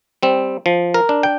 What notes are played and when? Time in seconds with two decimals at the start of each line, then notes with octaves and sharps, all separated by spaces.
0.23 G3 C4
0.66 F3
0.94 A#4
1.09 D4
1.23 G5